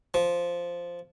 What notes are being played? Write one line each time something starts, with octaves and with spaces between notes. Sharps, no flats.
F3